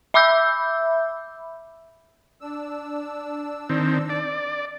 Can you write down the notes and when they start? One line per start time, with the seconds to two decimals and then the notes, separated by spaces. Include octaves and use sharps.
0.14 E5 B5 D6 E6 G6
2.41 D4 E6
3.69 D#3 C4
4.09 D5